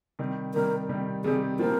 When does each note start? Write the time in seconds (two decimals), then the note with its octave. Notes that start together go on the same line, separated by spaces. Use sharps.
0.19 C3 D#3 G3
0.54 C3 D#3 G3 A#4
0.89 C3 D#3 G3
1.24 C3 D#3 G3 G#4
1.59 A#2 F3 C4 A#4